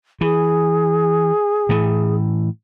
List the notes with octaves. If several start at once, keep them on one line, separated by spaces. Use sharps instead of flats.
E3 G#4
A2 E3